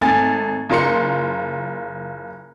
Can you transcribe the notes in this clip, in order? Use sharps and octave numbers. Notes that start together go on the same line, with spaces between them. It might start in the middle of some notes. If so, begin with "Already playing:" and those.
G#1 A3 G#5 A6
F#1 F4 A#4 C6 C#7